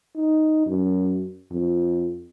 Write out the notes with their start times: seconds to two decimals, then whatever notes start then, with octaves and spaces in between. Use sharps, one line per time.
0.16 D#4
0.66 F#2
1.52 F2